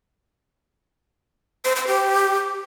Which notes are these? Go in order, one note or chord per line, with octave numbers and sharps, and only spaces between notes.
C5
C5
G4